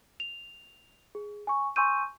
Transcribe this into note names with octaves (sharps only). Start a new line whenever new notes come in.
F7
G#4
G#5 C#6
G#5 C6 C#6 E6 G6 D#7